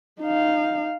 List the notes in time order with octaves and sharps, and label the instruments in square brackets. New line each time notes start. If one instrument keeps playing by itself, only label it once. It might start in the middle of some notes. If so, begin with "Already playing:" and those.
[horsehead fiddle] D#4 F5